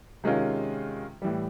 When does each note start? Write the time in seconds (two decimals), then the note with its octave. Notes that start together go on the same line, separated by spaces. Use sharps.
0.24 C3 D#3 G#3 C#4 F4
1.22 A2 E3 G3